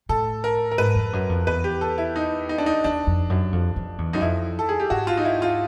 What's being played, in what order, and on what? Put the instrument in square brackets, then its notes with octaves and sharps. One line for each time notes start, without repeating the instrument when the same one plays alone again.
[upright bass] A2 [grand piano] A4
[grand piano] A#4
A#4
[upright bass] G#2 [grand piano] B4
[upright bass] F2
F#2
F2
[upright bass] E2 [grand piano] B4
[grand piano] G4
A4
E4
D#4
D#4
D4
D#4
[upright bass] E2 [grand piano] D4
[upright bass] F2
F#2
F2
F2
E2
[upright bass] F#2 [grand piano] D#4
[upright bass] F2 [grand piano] E4
[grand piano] A4
G#4
G4
[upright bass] G#2 [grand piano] F#4
[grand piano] F4
D#4
E4
F4